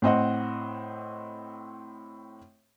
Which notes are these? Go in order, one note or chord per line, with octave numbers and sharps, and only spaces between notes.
A2 C4 D#5 F#5